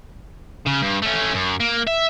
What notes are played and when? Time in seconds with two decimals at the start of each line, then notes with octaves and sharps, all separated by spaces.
0.66 C#3
0.82 G2
1.02 A3 C#4
1.34 F#2
1.60 A#3
1.87 E5